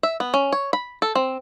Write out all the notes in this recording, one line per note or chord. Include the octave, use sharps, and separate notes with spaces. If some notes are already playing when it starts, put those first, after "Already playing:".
E5
B3
C#4
C#5
B5
A4
C4